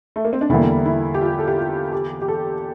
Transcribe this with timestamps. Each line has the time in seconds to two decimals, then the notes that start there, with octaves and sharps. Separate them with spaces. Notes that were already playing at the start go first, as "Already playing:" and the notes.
0.16 A3
0.25 A#3
0.33 C4
0.41 D4
0.49 E2 D3 G3 A#3 E4
0.86 E4
1.14 G4
1.21 F4
1.39 A4
1.47 G4
1.57 F4
1.92 G4
2.22 G4
2.28 A4